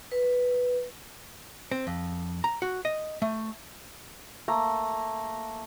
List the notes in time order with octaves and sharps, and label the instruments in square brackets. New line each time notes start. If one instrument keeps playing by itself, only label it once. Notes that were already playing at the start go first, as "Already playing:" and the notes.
[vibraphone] B4
[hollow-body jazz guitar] C4
F2
A#5
F#4
D#5
A3
[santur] A3 A#3 A#5